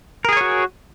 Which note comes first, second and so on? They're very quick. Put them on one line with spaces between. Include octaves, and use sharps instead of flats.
A#4 G#4 G#5 C#5 F#4